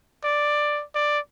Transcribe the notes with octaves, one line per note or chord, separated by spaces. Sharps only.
D5
D5